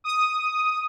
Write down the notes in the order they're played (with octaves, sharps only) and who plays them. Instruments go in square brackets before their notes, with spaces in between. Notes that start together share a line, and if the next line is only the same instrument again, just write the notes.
[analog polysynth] D#6